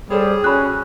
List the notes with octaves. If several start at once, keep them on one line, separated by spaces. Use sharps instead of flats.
G3 G#4 A4 C5 C#5
C#4 F#4 B5 F#6